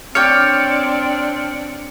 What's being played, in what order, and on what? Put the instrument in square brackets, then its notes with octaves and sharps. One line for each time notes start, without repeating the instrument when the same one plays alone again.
[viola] C4 D4 [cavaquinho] C#5 D5 G5 [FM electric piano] F6 C#7